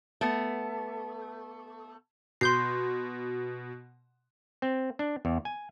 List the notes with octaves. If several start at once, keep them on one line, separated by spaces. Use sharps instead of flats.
A3 B3
B2 C6 G6 C7
C4
D4
E2
G#5